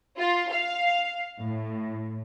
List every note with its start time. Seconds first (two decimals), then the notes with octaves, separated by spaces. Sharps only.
0.17 F4
0.51 F5
1.38 A2